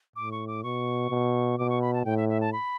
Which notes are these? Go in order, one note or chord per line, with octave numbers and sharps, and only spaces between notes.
A2 D6
C#6
D6
B2 C#6
B2
B2 D6
C#6
B5
A5
A2 G5
E5
E5
A5
B5